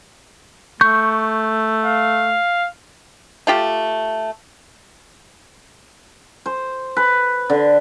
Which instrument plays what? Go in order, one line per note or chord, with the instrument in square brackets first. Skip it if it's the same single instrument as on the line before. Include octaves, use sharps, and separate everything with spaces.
[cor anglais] A3 [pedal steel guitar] C#6 G6
[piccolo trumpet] F5
[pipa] A3 F4 G4
[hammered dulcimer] C5
B4
D3